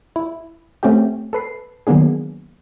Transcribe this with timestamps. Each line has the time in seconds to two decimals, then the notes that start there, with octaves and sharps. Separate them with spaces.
0.16 E4
0.83 A3 C4 C#4 F#4 G4 G5
1.33 A4 B4 C7
1.87 D#3 F#3 A#3 B3 D4 G#4